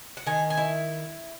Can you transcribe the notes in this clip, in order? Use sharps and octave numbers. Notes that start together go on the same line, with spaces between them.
F#5
D#3 G#5
G#5
E4